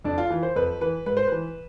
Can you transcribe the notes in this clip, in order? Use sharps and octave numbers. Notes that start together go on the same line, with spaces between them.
F2 D4
F4
E3
C5
F2 B4
E3 B4
G#2 B4
C5
E3 B4